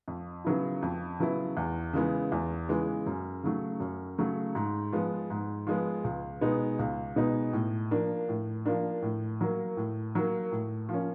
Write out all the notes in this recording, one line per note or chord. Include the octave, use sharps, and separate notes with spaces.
F2
C#3 F#3 B3 E4
F2
C#3 F#3 B3 E4
E2
C#3 E3 G#3 B3
E2
C#3 E3 G#3 B3
F#2
C#3 F#3 A3
F#2
C#3 F#3 A3
G#2
F3 G#3 B3
G#2
F3 G#3 B3
C#2
B2 G#3 B3 D#4
C#2
B2 G#3 B3 D#4
A2
F3 A#3 D4
A2
F3 A#3 D4
A2
F#3 A#3
A2
F#3 A#3
A2
F3 A#3 C#4